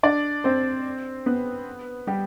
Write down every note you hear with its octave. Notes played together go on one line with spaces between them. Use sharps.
D4 D5
C4 C5
B3 B4
G3 G4